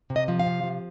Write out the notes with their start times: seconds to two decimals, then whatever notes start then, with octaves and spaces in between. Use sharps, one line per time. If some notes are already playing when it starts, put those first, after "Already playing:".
0.10 C3
0.16 D#5
0.28 F3
0.39 F5
0.46 C3
0.63 F3